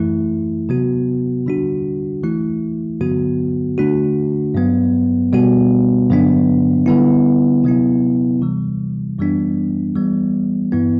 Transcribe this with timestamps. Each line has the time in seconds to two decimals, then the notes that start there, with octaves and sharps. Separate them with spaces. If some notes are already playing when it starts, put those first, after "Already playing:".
Already playing: F#2 E3 A3 E4
0.69 C3 F#3 B3 F#4
1.46 D3 G3 D4 F#4
2.23 E3 A3 E4
3.00 G2 D3 F#3 B3 F#4
3.78 D3 A3 D4 F#4
4.55 G2 F#3 B3
5.32 B2 G3 B3 F#4
6.10 G2 D3 F#3 B3 D4
6.86 D3 G3 B3 E4
7.64 C3 F#3 B3 E4
8.41 C3 E3 G3
9.18 F#2 E3 G3 B3 D4
9.95 E3 G3 B3
10.72 G2 E3 B3 E4